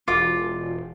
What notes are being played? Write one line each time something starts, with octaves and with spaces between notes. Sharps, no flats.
E1 F4 D6